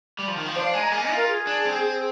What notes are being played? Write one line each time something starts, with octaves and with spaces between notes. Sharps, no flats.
G3
F3
D#3
F3
D4 C5
F5
G#3 G#5
A#5
A#3 G#5
D#5
F4
A#4
G#4
D4
C4